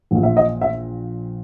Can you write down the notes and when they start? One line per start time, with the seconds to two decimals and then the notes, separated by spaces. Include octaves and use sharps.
0.11 A#1 A#2
0.23 E5
0.37 D#5
0.61 E5